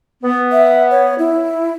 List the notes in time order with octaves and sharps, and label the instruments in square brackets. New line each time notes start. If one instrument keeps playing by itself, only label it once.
[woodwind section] B3
[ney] E5
C#5
E4